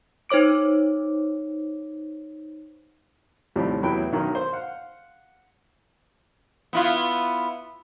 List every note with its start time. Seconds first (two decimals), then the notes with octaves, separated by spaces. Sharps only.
0.29 D#4 C5 C#5 D6 D7
3.56 D#2 A2 C3 F3 G3
3.83 E2 A2 F#3 E4 B4 G5
4.12 B1 D#3 F#3
4.35 C5
4.53 F5 F#5
6.73 B3 E4 F4